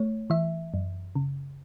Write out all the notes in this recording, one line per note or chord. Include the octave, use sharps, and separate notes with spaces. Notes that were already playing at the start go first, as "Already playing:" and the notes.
Already playing: A3 C#5
E3 E5
F#2
C#3